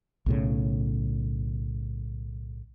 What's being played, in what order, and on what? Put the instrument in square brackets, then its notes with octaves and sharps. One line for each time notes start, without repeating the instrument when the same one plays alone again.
[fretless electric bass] B1 A2 C#3